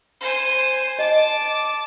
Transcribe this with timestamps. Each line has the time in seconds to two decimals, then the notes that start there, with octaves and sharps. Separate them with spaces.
0.21 C5 G#5
0.99 D#5 A5 D6